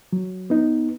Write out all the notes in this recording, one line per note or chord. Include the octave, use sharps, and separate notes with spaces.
F#3
B3 D#4